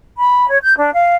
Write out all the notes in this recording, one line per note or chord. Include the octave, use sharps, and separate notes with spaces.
B5
C#5
G6
D4
F5